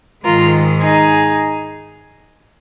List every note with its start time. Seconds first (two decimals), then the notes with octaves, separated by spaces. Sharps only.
0.25 G#2 D#3 G#3 F4 A#4
0.81 D#4 G#4